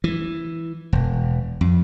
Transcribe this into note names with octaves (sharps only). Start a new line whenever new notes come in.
E3
E1
F2